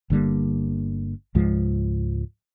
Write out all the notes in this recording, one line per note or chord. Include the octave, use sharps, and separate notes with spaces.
G1 D3 G3 A#3
C#2 G#2 F3 G#3